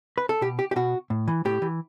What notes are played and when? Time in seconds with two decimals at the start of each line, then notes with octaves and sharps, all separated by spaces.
0.18 B4
0.29 A4
0.41 B2 G4
0.59 G4
0.71 G4
0.76 B2 F#4
1.10 A2
1.28 E3
1.45 A2 G4
1.62 E3